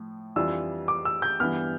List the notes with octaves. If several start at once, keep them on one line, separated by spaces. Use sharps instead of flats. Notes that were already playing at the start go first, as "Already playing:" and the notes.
Already playing: A2 F3
F2 E3 G3 D4 F4 E6
D6
E6
G6
G2 E3 B3 F6